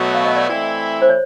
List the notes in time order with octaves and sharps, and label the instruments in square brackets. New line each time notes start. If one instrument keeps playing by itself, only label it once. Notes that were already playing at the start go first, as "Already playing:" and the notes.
Already playing: [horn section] B2 F#3 A3
[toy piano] F5
D#5
D5
[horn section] E3 A3 C4 E4
[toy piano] C5
C#5